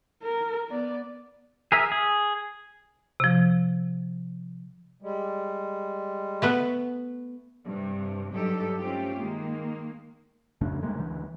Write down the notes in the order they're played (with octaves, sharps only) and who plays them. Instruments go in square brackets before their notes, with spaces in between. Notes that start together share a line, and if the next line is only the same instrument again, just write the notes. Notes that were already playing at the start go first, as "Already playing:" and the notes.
[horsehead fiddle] A#4
B3 D5
[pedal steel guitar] G#4 A#4 E5
G#4
[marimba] C3 F3
[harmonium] G3 G#3
[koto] A3 B3 B4
[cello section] G2 C3
G2 F#3 D#4 G4 A4
A3 C4 C#4 F4 G4
D#3 G#3 A#3
[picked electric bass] F2 C#3 A3 D4
C3 G3 G#3 A#3
D2 E3